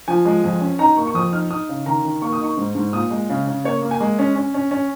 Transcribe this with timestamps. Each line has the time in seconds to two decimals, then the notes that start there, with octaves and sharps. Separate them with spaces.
0.08 F3 G#5
0.25 G#3
0.44 F2
0.61 C#4
0.79 D#4 A#5
0.97 A#3 C#6
1.07 C#6
1.14 F2 D#6
1.32 D#4 F6
1.51 D#4 D#6
1.69 C#3
1.86 D#3 A#5
2.04 D#3
2.22 A#3 C#6
2.33 D#6
2.40 D#4 C#6
2.58 G#2
2.75 G#2
2.93 A#2 D#6
3.11 G#3
3.30 C#3
3.47 C#3
3.64 A#3 C#5
3.82 A#3
3.91 G#5
4.01 G#3
4.19 C#4
4.35 C#4
4.54 C#4
4.71 C#4